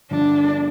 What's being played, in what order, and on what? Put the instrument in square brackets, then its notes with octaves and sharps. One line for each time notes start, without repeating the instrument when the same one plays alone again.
[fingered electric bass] G2 D3 F3 [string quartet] D4